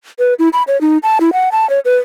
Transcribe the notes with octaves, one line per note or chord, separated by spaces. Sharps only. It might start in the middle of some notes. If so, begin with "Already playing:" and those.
B4
E4
B5
C#5
D#4
A5
E4
F#5
A5
C#5
B4